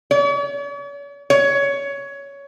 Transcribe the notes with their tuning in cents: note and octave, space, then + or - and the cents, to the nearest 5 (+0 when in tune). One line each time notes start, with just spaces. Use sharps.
C#5 +45
C#5 +15